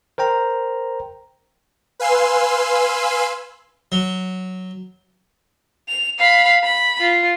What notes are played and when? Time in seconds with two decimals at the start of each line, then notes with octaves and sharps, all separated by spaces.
0.18 A#4 C5 G5 A#5
2.00 B4 F5 G#5 C6 E6
3.92 F#3
5.88 F7
6.18 F5 B5
6.64 B5
7.00 F4